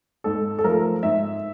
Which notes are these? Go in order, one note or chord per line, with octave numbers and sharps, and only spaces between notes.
G#2 A4
A4
F3 A3 A#4
G#2 E5